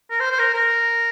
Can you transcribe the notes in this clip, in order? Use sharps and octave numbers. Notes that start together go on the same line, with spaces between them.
A#4
C5
C5
A#4
A#4